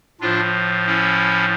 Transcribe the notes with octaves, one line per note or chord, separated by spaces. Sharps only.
A2 F3 D4 F4
C#4 E4